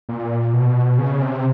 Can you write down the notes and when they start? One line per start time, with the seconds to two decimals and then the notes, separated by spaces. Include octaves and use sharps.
0.09 A#2
0.53 B2
0.98 C#3
1.22 C3